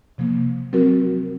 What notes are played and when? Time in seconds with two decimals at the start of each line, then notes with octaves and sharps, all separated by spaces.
0.18 C3 F3 A#3
0.73 F#3 C4 F#4 A#4